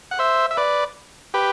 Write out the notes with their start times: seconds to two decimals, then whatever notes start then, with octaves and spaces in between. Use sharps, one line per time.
0.11 F#5
0.19 C5 E5
0.51 E5
0.57 B4 D5
1.34 G4 B4